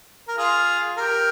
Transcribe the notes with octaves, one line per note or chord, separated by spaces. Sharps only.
A#4
F4 G#4
G4 A#4